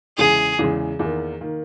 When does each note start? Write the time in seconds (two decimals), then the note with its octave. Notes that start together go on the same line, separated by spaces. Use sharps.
0.18 E2 C#3 E3 G#3 G#4
0.59 E2 C#3 E3 G#3
0.99 E2 D#3 A#3
1.41 D#3 A#3